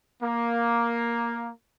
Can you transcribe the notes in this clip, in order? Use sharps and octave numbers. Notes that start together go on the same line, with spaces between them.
A#3